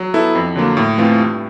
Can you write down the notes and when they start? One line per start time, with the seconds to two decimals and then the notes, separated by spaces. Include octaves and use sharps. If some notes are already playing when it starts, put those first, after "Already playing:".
Already playing: F#3
0.14 B3 E4 A4
0.35 F2
0.56 D3 F#3 A#3
0.77 A2
0.98 E3 A3 C4 F4
1.19 G2